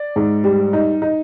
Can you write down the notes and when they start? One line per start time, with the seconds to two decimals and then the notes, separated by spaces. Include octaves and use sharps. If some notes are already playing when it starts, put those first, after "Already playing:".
Already playing: D5
0.16 G#2
0.44 G3
0.73 D#4
1.02 D#4